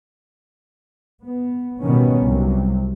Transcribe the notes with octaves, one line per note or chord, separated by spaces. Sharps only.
B3
B2 D#3 G3 B3 C#4
C2 C3 F#3